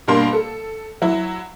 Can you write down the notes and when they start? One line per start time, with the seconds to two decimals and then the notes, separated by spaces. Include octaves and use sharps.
0.08 G2 B2 G3 A#3 F5 C6
0.33 A4
1.02 F#3 E4